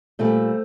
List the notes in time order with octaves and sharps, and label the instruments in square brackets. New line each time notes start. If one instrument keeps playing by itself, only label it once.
[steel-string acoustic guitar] A#2 G3 A3 C4